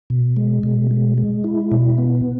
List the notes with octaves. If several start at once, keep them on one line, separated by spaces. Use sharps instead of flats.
B2
G#3
B2
G#3
G#3
E4
B2
B3